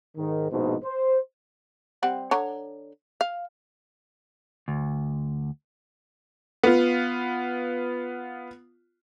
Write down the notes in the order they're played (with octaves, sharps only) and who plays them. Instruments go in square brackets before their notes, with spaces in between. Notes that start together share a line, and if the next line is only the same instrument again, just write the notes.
[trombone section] G#2 D#3
A#1 G#2 B2 D#4 C5
C5
[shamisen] G3 C4 F#5
D3 C#5 A#5
F5
[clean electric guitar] D2
[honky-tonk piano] B3 F4